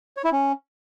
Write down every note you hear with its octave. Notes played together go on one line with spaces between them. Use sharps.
C#5
E4
C#4